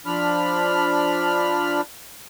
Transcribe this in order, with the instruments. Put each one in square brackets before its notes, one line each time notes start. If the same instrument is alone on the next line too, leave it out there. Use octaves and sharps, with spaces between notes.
[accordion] F3 D4 B5 F6